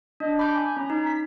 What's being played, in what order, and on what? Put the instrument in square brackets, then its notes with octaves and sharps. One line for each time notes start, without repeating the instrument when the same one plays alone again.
[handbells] D4 [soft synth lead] D#5
[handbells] B5 G6 [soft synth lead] D6
[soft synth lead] G#5
[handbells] C#4 [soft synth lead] A#5
[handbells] D#4
[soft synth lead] B6